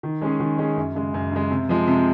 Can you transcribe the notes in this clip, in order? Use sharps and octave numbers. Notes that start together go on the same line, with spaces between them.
D#3
G#3 C#4 G#4
D#3
G#3 C#4 G#4
F#2
C#3 G#3
F#2
C#3 G#3
C3
F3 G#3
C3